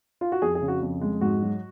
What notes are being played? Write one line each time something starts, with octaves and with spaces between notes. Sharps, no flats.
F4
F#4
F2 G#4
G#4
C#3
F#4
F2
G#3
G#2 F#4
F#3